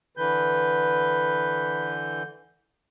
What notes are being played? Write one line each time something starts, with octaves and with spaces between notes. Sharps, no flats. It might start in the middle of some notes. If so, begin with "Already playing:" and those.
D3 E3 B4 G6